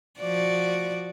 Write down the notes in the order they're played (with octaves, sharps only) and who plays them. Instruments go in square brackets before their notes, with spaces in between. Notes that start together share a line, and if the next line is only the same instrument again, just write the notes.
[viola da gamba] F3 F#4 D5